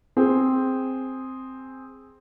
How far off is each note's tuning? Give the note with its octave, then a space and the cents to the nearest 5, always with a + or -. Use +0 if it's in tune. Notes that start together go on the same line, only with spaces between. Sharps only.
C4 +0 G#4 -5